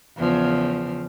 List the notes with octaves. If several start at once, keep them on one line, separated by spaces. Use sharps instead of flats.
E2 C#3 F3